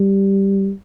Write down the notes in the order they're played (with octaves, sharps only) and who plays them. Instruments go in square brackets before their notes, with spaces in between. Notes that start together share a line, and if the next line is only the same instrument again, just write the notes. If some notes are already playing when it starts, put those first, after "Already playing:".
Already playing: [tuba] G3